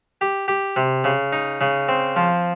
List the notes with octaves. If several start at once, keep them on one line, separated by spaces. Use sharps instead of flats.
G4
G4
C3
C#3
D#4
C#3
C4
F3